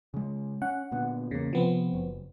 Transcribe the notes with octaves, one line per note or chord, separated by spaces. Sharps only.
C#3 G#3
C#4 F#5
A#2 D3 B3
E2 C#3 A#3
C3 F3 B3 C4
F#1